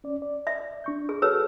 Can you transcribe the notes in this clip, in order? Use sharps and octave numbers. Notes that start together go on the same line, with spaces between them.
C#4 D5
D5
E5
D4 C#6 G6
G#4
F#4 G#4 A4 B4 C#5 E6